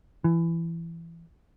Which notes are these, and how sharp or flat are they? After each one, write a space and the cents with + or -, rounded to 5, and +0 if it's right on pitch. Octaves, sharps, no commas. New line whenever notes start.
E3 +20